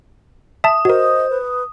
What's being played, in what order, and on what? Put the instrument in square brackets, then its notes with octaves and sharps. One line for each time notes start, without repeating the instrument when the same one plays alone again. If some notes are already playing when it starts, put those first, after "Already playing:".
[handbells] E5 A5 [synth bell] D#6
[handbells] F#4 A#4 [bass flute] C5 [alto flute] D#5
[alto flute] B4